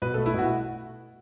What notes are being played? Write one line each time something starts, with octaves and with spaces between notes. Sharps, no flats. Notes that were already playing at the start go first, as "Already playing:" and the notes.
B2 B4
A3 A4
E4
B2 F#4